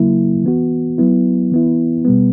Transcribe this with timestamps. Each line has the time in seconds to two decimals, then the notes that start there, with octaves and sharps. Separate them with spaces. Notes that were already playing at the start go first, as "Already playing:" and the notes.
Already playing: C#3 F#3 A#3 E4
0.44 E3 B3 F#4
0.98 F#3 B3 E4
1.52 E3 B3 E4
2.05 B2 G3 B3